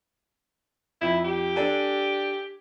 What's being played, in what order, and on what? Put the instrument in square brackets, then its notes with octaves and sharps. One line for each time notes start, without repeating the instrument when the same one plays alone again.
[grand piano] F2 [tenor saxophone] E4
[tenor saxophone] G4
[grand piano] D4 A4 G#5